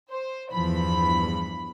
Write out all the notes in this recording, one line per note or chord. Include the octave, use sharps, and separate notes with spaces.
C5
E2 G2 E3 F3 B5